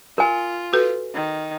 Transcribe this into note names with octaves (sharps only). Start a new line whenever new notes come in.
F4 A#4 G#5
F#4 A4 B4
D#3